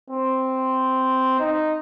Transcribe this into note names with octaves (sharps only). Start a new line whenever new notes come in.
C4
D#4